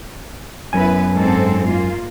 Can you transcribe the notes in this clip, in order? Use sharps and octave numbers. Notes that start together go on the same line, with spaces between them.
F#2 F#3 B3 E4 B4 G#5
G#2 C4 A4
A#3 F4